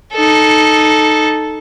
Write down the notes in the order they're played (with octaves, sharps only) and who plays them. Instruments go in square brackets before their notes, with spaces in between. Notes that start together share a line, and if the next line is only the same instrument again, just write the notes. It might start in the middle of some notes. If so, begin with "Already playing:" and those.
[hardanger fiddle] D#4 A4